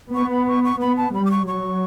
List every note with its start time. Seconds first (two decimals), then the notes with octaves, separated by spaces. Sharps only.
0.14 B3 C#6
0.31 B5
0.48 C#6
0.64 C#6
0.81 B3 B5
0.97 A5
1.15 G3 B5
1.25 D6
1.31 C#6
1.48 F#3 C#6